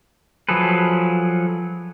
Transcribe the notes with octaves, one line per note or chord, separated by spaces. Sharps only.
F3 F#3 G#4 A4 B4